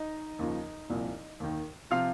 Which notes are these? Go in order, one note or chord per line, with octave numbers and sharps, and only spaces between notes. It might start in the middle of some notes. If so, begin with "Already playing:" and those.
Already playing: D#4 D#5
D#2 C#3 F3
C2 A#2 F3
D#2 D#3
C3 F3 F4 F5